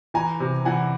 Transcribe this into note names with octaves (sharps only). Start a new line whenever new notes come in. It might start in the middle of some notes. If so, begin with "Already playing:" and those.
E3 G#5 A#5
C3
E3 F#5 G#5